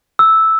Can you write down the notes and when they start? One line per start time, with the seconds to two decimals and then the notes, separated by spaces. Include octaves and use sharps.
0.19 E6